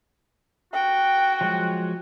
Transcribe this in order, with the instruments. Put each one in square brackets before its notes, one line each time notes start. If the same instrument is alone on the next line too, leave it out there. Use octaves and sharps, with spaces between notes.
[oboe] F#4 [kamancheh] G5
[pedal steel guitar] F3 F#3 G#3